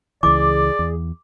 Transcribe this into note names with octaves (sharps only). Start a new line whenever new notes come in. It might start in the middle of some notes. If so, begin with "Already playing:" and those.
C#2 E3 G#4 D5 D6
E2